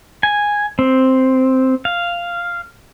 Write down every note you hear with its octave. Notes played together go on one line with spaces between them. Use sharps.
G#5
C4
F5